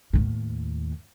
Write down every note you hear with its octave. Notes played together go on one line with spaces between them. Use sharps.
D#2 A2